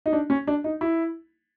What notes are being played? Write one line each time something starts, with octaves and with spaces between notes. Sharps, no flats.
D#4
D4
C#4
D4
D#4
E4